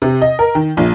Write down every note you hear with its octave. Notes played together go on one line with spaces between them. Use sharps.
C3
D#5
A#4
D#3
A#1